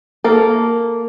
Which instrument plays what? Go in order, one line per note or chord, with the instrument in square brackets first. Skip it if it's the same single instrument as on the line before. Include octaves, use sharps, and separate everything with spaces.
[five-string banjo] A#3 A4